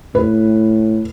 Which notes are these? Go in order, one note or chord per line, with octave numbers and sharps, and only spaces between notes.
A2 B4